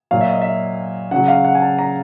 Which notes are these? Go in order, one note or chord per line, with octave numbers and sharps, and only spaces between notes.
A#2 F#3 F5
E5
D#5
E5
C#3 F#3 F#5
F5
F#5
G#5
A5
A#5